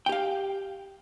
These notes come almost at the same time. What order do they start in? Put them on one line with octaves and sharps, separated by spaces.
G5 G4 F5